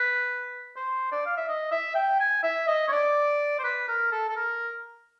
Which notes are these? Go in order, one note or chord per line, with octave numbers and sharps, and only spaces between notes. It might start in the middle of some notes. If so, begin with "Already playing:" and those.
Already playing: B4
C5
D5
F5
E5
D#5
E5
G5
G#5
E5
D#5
C#5
D5
C5
B4
A#4
A4
A4
A#4